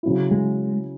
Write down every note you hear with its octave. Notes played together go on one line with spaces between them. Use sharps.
C#3 F#3 C#4 E4
G#3